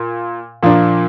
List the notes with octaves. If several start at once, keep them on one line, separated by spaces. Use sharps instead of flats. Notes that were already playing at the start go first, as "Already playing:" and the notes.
Already playing: A#2
A#2 F3 A#3 D4